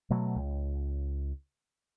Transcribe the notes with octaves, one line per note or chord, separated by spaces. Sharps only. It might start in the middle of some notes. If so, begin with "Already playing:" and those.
B2 F#3 A3
C#2